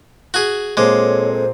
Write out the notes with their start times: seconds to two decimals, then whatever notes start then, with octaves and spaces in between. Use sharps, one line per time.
0.34 F#4 G#4
0.77 A#2 G#3 C4 A4 C#5 D6
1.33 C5